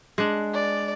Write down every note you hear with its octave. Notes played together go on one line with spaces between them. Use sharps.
G#3 D4
D5